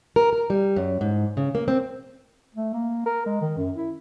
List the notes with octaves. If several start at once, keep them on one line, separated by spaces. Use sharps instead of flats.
A#4
A#4
G3
F#2
G#2
C#3
A#3
C4
A3
A#3
A#4
G#3
D#3
F#2
E4